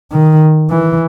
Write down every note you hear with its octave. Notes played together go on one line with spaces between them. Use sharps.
D#3
E3